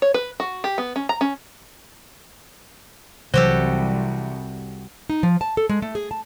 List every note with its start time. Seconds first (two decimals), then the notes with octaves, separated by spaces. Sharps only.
0.02 C#5
0.14 B4
0.40 F#4
0.64 G4
0.78 B3
0.96 C#4
1.09 A#5
1.21 C#4
3.34 C2 C3 E3 F#3 F#4 G4 A4 C5
5.10 D#4
5.23 F3
5.41 A5
5.57 A4
5.69 G#3
5.82 A3
5.95 G#4
6.11 A5